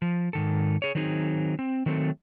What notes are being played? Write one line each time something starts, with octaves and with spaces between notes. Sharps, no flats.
F3
G#2 D#3 A4
G#4 C#5
D#3 F#3 C4 D#4 G#4
C4
D#3 F#3 A3 C4 A4